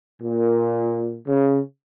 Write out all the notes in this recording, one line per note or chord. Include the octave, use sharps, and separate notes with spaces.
A#2
C#3